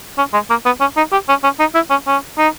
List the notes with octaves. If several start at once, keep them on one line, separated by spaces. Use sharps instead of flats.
C#4
G#3
A#3
B3
C#4
D#4
G4
C#4
C#4
D#4
E4
C#4
C#4
D#4